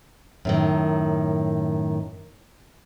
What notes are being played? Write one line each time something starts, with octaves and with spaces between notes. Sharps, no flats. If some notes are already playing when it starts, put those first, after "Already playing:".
F#2 A2 D#3